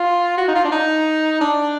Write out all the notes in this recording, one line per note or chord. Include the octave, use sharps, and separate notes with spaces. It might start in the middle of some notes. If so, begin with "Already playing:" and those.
Already playing: F4
F#4
D#4
F4
D4
D#4
D4